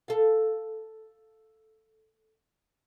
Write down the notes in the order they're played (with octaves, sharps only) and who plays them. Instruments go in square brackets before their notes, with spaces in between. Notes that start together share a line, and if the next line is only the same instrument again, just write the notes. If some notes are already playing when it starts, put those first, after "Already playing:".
[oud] A4 F5